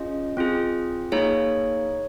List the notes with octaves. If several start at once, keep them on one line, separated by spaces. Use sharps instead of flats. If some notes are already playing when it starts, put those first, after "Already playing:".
Already playing: C#4 F4 G#4 D#5
C4 F4 G#4
A#3 D#4 G#4 C#5